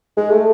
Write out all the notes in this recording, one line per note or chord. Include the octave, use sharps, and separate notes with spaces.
G#3
A3